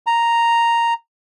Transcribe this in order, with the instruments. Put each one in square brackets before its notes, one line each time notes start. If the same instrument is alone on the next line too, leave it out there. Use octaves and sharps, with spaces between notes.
[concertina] A#5